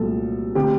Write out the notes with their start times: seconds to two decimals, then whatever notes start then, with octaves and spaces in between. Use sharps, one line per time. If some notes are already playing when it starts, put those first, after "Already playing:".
Already playing: C2 A#2 F#3 A3 A4
0.55 D3 A3 C4 G4